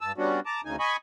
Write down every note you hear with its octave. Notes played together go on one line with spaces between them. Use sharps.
G2 A5 E6
G3 B3 C#4 D4 F#4
A5 A#5 D6
D2 C#3 D#4 G#5
D#5 G#5 B5 C#6